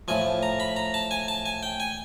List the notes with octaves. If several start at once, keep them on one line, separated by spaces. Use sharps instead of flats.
A2 F3 G#5
A#5
B5
A#5
A5
G#5
A5
G#5
G5
G#5